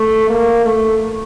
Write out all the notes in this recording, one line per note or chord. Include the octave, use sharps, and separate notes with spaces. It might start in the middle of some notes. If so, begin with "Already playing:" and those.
Already playing: A3
A#3
A3